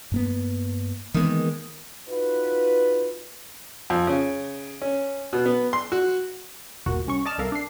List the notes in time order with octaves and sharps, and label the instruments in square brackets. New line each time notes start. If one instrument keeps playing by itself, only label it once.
[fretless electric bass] G2 A#3 B3
[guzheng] D#3 G#3 [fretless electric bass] E3 A#3 B3
[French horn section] D#4 F4 F#4 B4
[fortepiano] F2
C#3
C#4
B2
B3
C6
F#4
[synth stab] G1 D#2 A#2 F#4 A#4
C2 C#4 C#6
D5 D#5 A5 F6
C2 A4 A#4 E5 F5
D4 C7